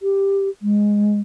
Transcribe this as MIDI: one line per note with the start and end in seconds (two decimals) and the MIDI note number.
0.01 0.49 67
0.62 1.20 56